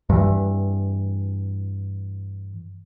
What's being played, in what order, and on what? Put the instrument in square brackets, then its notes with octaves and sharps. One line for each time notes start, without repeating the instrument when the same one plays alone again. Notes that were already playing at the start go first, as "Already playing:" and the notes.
[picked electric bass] G2 E3